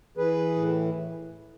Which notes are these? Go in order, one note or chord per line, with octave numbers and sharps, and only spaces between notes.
E3 G#4 B4
A2